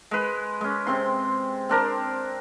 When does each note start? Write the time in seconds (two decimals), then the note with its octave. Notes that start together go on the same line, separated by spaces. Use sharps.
0.11 G#3 B4
0.61 G#3 C#4
0.87 C3 C4 C6
1.69 C4 D4 A#4